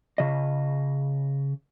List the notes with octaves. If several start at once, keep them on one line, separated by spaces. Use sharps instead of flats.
C#3 D#5